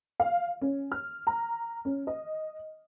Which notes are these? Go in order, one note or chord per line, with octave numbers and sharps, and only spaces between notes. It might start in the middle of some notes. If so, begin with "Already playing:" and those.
F5
C#4
F6
A#5
C#4
D#5